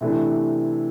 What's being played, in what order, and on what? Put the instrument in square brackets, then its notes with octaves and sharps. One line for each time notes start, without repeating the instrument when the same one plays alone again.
[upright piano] C3 E3 A3 D4